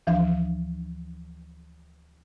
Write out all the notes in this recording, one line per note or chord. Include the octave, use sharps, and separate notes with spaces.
D2 E3 F3 D4 F5